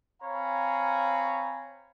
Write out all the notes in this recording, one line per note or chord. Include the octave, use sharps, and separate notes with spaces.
C4 C#5 F5 G#5 A#5 B5